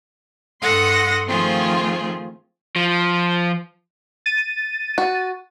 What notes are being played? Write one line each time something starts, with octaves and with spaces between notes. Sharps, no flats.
G2 A4 F#5 C6 D#6 A#6
D#3 F3 A3 C4 F4 G#4
F3
A6 D#7
F#4